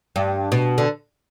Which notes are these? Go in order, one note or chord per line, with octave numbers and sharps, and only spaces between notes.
G2
B2
D3